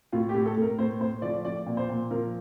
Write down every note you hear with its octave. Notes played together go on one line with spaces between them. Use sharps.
A2 F4
G4
A2
A4
A2 A#4
A2 C5
A2 C5
F3 D5
F3 D5
A#2
C5
A#2
F3 A#4